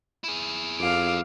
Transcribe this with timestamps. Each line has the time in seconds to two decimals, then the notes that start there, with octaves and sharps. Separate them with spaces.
0.24 E4 G#4
0.80 F2 F5 D6